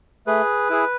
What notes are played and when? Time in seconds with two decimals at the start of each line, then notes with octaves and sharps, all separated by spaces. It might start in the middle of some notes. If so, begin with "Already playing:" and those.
0.27 A3 G#4 B4
0.70 E4 G#4